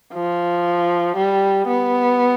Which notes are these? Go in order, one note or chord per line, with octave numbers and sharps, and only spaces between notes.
F3
G3
B3